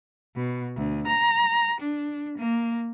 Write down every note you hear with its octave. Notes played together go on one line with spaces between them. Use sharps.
B2
D2
A#5
D4
A#3